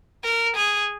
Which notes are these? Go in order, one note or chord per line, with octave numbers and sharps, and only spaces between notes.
A#4
G#4